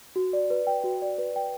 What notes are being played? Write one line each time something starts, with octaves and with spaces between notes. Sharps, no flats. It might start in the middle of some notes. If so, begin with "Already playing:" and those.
F#4
D5
B4
G5
F#4
D5
B4
G5